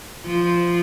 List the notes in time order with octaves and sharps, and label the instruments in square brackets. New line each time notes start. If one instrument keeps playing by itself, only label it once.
[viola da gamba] F3